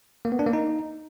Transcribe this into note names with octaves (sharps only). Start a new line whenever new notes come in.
A#3
B3
D4
A#3
D#4